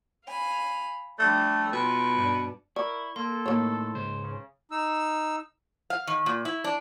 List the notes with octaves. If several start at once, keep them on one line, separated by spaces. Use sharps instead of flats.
F5 G#5 B5
F3 G3 A3 D4
B2 F4
G2 D4
E4 A#4 D5 C#6
A#3 A4 C6
A2 D#3 A#3 C#5
C#2 G#2 C5
C#3
D#4 E6
F5
D#3
A#2
E4
D4